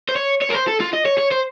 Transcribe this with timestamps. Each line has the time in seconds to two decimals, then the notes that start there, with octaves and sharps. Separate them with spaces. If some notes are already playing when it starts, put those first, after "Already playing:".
0.09 C5
0.16 C#5
0.42 C#5
0.50 A#4
0.55 C5
0.68 A4
0.81 F4
0.94 D#5
1.06 C#5
1.18 C#5
1.32 C5